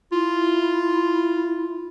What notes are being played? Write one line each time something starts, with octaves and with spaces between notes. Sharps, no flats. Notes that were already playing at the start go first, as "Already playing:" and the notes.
E4 F4